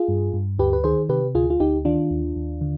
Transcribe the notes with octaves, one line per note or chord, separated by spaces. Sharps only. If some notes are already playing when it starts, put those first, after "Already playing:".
Already playing: F4 G#4
G2
G2
D2 G4 B4
B4
D#3 G#4 C5
C3 G4 B4
D2 F4 G#4
F4
D2 D#4 G4
D#3 D4 F4
D#2
D#2
D3